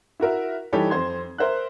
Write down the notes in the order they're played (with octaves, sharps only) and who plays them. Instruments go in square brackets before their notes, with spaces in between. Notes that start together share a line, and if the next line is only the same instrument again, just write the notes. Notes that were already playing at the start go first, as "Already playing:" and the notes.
[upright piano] E4 F#4 A#4 E5
E3 G3 D#4 G4 A4 C#5
F2 C4 C5 C6 G#6
A#4 C5 E5 F#6